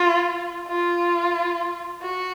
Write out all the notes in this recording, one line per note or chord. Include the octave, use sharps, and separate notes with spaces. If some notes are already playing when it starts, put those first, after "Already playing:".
Already playing: F4
F4
F#4